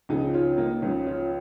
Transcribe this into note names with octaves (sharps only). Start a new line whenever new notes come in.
C#2 C#3 F3 D#4 G#4
C#4 F4
A#3 D#4
C#2 C#3 F3 C#4
C#4 F4